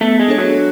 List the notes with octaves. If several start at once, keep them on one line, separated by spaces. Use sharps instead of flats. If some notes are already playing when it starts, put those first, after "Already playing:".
A3 B3
G#3
D4 A4 C#5
F#3